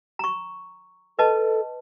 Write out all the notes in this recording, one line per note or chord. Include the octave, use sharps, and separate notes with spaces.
A#5 C#6
A4 B4 D#5 A5